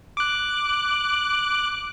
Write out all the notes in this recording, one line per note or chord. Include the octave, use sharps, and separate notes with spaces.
D6 F#6